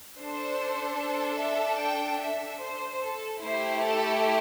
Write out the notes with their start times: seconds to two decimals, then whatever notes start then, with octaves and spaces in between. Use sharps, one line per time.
0.19 D4 A4 C5
1.01 C5
1.40 E5
1.80 G5
2.21 E5
2.61 C5
3.02 A4
3.42 A3 E4 G4 C5
3.82 A4